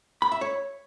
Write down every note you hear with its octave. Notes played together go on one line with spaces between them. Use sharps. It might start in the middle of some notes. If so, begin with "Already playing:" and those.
B5
E5
C#5